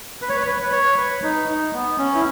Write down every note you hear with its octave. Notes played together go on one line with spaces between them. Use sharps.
B4
C#5
B4
C#5
B4
B4
C#5
B4
D#4
D#4
B3
C#4
E4